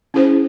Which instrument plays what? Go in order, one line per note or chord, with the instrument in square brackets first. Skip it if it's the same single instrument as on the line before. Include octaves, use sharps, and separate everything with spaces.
[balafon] C#4 E4 G#4 C5